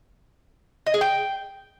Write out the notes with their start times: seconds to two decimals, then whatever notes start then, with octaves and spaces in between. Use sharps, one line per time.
0.87 D#5
0.94 G#4
1.01 G5